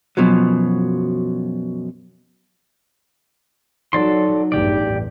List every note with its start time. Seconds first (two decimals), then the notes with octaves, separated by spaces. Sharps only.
0.17 F#2 B2 F3 F#3
3.93 F#3 D#4 A4 D5 C6
4.52 A1 E2 G2 G4 D5